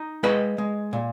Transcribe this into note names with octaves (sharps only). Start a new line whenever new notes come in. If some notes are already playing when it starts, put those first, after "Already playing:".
Already playing: D#4
G#3 B4 D#5
G#3
A#2